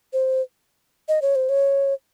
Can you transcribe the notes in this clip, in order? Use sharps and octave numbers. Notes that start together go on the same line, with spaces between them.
C5
D#5
C#5
C5
C#5